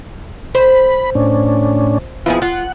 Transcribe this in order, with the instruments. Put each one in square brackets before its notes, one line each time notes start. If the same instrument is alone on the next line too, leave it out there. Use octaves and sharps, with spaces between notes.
[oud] C5 [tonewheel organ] B5
[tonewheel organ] A2 C#4 D4
[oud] F2 F3 G#4 [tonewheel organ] B3 E4 F4
[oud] F4 [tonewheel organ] F#5